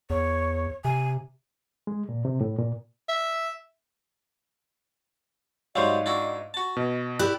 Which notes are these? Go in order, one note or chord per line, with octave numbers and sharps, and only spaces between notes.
E2 C#5
C3 G#5
G#3
A#2
C3
A2
A#2
E5
G#2 F#3 G3 C5 D#5 F5
D4 E4 F#4
F#4 A5
B2 D#5
E4 G4 D5 F#6